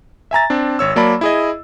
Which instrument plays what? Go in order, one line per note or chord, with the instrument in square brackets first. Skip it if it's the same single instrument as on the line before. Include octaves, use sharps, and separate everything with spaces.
[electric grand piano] E5 G#5 A#5 A6
C4 D4
G#1 C#5 E6
F#3 A#3 D5 A5 B5
E4 G#4 D#5